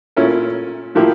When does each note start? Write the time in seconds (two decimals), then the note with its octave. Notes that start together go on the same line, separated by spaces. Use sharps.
0.17 A#2 A3 C#4 E4 A#4
0.95 A2 F3 A#3 E4 G4